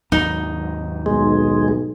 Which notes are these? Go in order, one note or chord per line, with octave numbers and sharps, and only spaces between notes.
D#2 G#2 F#3 D#4
B1 G#3